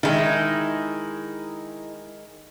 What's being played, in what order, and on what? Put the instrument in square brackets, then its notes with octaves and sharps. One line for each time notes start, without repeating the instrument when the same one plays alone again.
[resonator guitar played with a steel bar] D#3 G#3 [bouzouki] D#4 E4